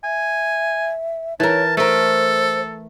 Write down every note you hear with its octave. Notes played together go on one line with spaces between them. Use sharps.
E5 G#5
E3 A#4 C#5 A5
A3 A4 A#4 C5